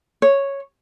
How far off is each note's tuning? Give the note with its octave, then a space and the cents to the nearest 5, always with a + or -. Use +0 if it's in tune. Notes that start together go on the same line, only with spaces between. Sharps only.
C#5 -5